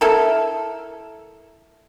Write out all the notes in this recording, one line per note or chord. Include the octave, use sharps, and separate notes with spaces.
E4 A4 A#4